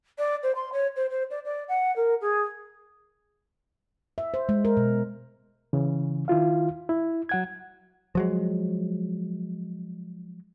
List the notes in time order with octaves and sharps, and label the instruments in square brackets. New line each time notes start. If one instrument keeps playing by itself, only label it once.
[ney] D5
C5
C6
C#5
C5
C5
D5
D5
F#5
A#4
G#4
[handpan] E5
C5
G#3
A#4
B2
[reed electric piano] C#3 E3
D#3 E4 F4 F5
E4
F#3 F#5 G#6
[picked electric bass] F3 F#3 G#3